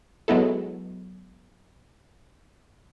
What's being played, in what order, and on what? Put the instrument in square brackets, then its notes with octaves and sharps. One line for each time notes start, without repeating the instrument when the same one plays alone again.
[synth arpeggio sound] F#3 G#3 B3 E4 A4